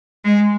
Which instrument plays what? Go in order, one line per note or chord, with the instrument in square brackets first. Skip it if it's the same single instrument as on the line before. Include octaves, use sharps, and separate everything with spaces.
[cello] G#3